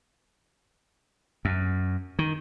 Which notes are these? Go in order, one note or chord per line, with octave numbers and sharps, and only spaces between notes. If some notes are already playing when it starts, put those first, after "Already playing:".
F#2
D#3